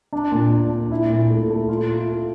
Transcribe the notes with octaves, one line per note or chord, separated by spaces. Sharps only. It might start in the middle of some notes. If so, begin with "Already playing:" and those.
D4
A#2
D4
D4
E4
A#2
A3
A3
F4
F4
A4